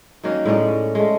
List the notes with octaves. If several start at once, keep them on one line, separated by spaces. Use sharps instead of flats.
D#3 F#3 A#3 C#4
A2 G#3 C#4 D5
G#3 A3